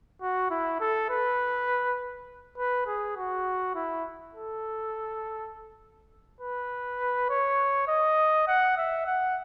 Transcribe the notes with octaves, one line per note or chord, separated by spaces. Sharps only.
F#4
E4
A4
B4
B4
G#4
F#4
E4
A4
B4
C#5
D#5
F#5
E5
F#5